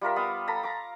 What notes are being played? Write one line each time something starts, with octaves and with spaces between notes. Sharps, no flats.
G3 F4 A#4 E5
B3 F5 D#6
A4 A#5 B5
A#5 D6